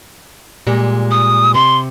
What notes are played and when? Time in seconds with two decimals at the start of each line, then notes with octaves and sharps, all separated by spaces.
0.67 A#2 G3 G#3
1.11 D#6
1.54 C3 C6